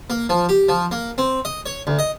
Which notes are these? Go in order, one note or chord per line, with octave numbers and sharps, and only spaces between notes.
A#3
F3
G4
F3
A#3
C4
D#5
C#5
D2
D#5